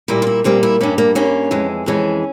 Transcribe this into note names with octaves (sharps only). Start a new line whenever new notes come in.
A#2 G3 A#3 E4
F4
E4
A#2 G3 A#3 C4
E4
G2 G3 A#3 C#4
A#3
G2 G3 A#3 C#4
F2 E3 G#3
F2 E3 G#3 C#4